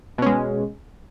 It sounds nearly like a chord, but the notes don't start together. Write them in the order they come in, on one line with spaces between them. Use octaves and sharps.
B2 C#4 G#3